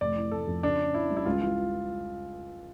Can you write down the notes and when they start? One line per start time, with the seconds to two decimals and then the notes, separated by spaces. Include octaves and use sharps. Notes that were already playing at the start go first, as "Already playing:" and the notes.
0.01 F1 D5
0.16 E3
0.31 F1 A4
0.47 F2
0.63 C#3 D4
0.79 C#4
0.94 C#3 E4
1.10 G3
1.17 E4
1.26 C#2 F4
1.42 E3 F4